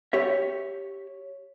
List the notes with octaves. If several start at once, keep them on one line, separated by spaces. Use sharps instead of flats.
G4 C#5 E5